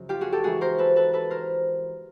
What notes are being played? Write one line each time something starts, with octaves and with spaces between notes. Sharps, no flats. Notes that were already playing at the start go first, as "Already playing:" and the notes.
Already playing: F#2 C#3 F3
F4 G4
F#4 G#4
G4 A4
G#2 E3 F#4 G#4
A#4 C5
A4 B4
A4 B4
A4 B4
A#4 C5